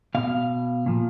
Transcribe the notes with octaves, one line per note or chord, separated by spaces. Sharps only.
B2 F5
A#2 F3